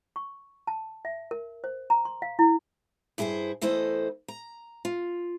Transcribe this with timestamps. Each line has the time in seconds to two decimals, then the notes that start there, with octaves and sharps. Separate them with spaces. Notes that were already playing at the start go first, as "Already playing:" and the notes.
0.16 C#6
0.67 A5
1.05 E5
1.31 A#4
1.64 C5
1.90 A#5
2.05 C6
2.22 F5
2.39 E4
3.18 G2 E4 G#4 A#4 C5
3.61 E2 A3 E4 A4 C5 D#5
4.28 A#5
4.85 F4